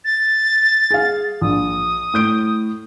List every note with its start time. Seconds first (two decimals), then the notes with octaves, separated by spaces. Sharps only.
0.04 A6
0.91 G#4 F5
1.41 A#1 D#6
2.14 A2 G6 D7